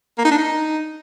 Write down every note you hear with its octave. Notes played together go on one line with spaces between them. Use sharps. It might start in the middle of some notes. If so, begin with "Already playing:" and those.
A#3
D#4
D4
D#4